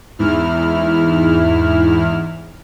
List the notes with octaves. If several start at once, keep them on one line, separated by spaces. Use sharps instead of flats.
E2 G#2 E4 F6